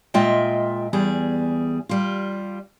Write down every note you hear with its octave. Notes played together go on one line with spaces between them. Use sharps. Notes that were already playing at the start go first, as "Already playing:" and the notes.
A#2 G#3 F4 D#5 E5 G5
E2 G3 G#4
G3 F4